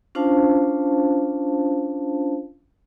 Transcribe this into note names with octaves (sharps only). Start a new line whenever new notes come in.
C#4 D4 F4 C5 F5 A5